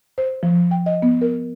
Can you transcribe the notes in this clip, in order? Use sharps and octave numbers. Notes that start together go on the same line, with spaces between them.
C5
F3
G5
D#5
B3
A#4